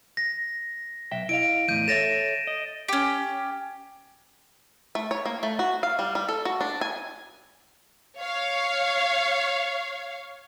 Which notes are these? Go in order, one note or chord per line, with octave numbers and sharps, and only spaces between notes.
A#6
B1 E5 G5
E4 D#5 F5 D7
E2 A2 E3 G6 D#7
A4 C#5 E5 A6 A#6 E7
D#5
C#4 G4
A3
C#5
A#3
A3
F#4
F5
G3
G3
A4
F#4
D4
G#5
C#5 F5